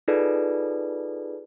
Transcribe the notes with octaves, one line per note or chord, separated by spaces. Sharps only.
D#4 F4 G#4 A4 B4 D5